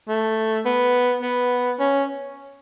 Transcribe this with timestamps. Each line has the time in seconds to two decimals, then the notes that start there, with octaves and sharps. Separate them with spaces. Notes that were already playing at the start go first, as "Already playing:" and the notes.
0.08 A3
0.65 B3
1.22 B3
1.79 C#4